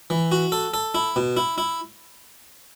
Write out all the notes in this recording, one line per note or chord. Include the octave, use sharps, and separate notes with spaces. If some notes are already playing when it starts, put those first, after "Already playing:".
E3
F#4
A4
A4
E4
B2
E4
E4